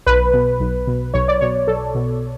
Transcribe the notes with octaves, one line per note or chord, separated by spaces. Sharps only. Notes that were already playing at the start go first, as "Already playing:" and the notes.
B1 B4
B2
B1
B2
B1 C#5
D5
B2 C#5
B1 A4
B2